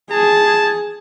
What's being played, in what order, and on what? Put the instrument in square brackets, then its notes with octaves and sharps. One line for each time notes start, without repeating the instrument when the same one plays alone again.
[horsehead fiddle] G#4 [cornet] A5